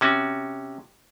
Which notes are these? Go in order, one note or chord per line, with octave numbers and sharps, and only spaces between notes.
C3 C#4 F#4